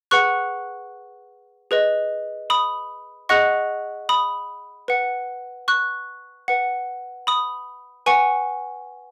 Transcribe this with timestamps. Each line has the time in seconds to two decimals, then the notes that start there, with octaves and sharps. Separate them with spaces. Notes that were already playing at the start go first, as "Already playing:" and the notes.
0.11 G#4 B4 F#5 C#6 F#6
1.71 G#4 B4 D#5
2.50 B5 D#6
3.29 G#4 D#5 F#5 C#6 F#6
4.09 B5 D#6
4.88 B4 F#5
5.68 C#6 F#6
6.48 B4 F#5
7.27 B5 D#6
8.06 B4 F#5 G#5 C#6